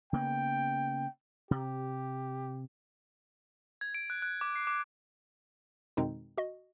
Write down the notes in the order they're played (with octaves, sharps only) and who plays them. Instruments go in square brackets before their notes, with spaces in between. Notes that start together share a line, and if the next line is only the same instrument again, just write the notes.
[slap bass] C#3 A#3 B3 [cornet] G5
[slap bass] C3 [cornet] G4
[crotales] G#6
D7
F#6
F#6
D6
C7
D6
[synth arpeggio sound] F2 B2 D#3 G#3 C4 D#4
F#4 D#5